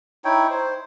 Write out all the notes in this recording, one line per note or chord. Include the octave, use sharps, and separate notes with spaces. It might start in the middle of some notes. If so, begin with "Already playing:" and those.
D#4 E4 C#5 G5
C5